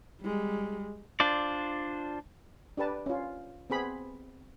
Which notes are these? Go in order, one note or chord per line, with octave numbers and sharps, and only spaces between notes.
G3 G#3
D4 F4 C5 D5
D4 G4 B4 A5
C#4 F4
B3 C4 G#4 B5